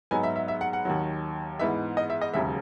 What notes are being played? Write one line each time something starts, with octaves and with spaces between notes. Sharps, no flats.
G#2 F#3 B3 D#4 G#5
E5
E5
E5
F#5
F#5
D#2 D#3 F#3
G#2 E3 B3 D#4 E5
D#5
E5
D#5
E1 D#2 C#3 F#3 E5